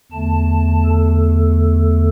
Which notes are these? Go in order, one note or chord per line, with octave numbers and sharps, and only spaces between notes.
E2 D3 A3 A5
A4